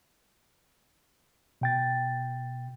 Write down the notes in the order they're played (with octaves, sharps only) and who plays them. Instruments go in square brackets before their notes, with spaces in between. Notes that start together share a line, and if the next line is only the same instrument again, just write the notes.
[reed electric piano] B2 G5 A6